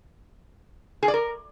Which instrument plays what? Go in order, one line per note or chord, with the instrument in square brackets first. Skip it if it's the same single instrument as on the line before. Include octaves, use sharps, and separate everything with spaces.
[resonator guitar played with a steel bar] G#4
D5
A#4